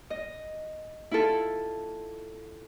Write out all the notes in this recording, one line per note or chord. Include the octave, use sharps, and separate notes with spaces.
D#5
E4 F4 A4